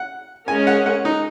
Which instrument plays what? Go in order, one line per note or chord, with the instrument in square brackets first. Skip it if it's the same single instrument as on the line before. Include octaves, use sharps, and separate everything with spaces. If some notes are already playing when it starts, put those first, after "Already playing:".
Already playing: [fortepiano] F#5
[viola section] G#3 C#4 A#4 [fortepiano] G#5
[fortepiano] F#5
F#5
D#4